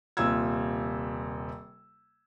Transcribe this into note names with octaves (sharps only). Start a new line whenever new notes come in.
D#1 C3 F4 E6 G#6